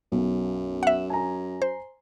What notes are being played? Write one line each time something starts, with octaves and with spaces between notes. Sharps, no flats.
B1 F#2
E5 F#5
G#5 A#5
C5